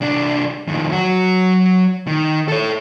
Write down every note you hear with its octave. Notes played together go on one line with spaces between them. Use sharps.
C2 D4
F2 D#3
F#3 F#4
D#3
A4 C#5